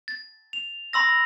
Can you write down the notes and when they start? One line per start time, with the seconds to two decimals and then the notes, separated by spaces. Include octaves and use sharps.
0.08 A6
0.53 F7
0.93 B5 C6 E6 A#6